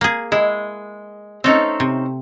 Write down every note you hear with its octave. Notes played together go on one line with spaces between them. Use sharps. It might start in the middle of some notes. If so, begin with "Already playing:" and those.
A#3 G#4
G#3 E4
A3 C4 C#4 D#4 A4
C3